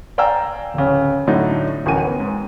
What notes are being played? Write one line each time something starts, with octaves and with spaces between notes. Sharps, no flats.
D5 F5 G5 G#5 A#5 E6
D1 C#3
A2 D3 F#3 D#4
D1 A1 F#4 A#4 G#5 D#7
B3
G#2